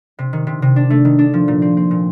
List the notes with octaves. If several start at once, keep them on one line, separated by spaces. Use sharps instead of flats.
C3
D#3
C3
C3
D4
A3
D#3
D4
F3
A#2
C4
C4
A#2